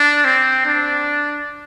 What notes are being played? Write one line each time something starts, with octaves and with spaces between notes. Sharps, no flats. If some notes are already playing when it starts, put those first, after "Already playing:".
Already playing: D4
C4
D4